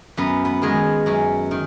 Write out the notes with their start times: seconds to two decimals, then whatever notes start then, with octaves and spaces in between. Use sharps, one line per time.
0.17 F#2 B3
0.45 B3
0.62 D#3 G#3 B3
1.06 F#2 C#4
1.51 D#3